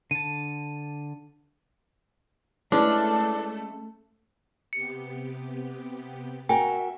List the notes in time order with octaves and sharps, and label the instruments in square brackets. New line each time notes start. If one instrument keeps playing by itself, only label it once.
[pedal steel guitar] D3 A5 [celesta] D#7
[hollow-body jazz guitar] G#3 C#4 [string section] A3 A4 [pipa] D4 [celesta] E4 B4
[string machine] C3 B3 G4 [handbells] C#7
[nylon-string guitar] F#4 A#4 G5 [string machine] E5 [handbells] G#5